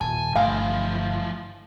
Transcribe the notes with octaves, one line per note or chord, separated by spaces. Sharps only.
D#1 G#5 A5
G1 E3 F3 A3 F5 G#5